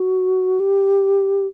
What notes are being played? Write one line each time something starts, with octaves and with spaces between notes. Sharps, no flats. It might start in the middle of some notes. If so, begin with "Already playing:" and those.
Already playing: F#4
G4